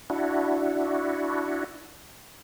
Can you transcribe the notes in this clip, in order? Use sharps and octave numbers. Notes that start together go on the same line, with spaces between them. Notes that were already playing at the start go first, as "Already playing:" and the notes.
D4 E4 F#4